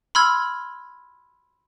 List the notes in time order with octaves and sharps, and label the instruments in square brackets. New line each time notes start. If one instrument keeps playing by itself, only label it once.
[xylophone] B5 C6 E6 F6 G#6